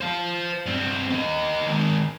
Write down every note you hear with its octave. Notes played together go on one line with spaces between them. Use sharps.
C5 F5
G2 C4
A#3 D#5
D#3 G#3